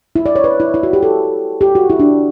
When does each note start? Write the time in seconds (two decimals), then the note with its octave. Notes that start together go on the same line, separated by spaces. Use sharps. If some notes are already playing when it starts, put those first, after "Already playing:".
0.16 E4
0.26 D5
0.36 C#5
0.44 B4
0.60 E4
0.74 E4
0.83 F#4
0.93 G4
1.03 A4
1.61 G4
1.75 F#4
1.90 E4
2.00 D4